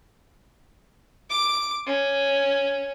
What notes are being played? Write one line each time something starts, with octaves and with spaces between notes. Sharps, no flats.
D6
C#4